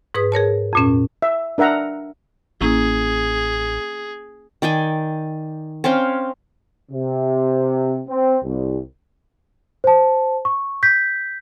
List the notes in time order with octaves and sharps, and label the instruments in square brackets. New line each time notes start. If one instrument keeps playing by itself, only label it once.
[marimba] G#2 G#4 B4 D#6
G#4 A#4 C#5 A5
F2 A#2 C#4
[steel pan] E5
D4 A#4 E5 F#5 A#5
[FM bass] A1 [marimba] A#3 C#4 E4 [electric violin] G#4
[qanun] D#3 D5 G5 G#5
C4 C#4 F5 G5
[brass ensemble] C3
C4
C2
[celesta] C5 A5
C#6
G6 B6